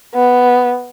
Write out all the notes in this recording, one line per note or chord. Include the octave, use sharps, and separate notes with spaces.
B3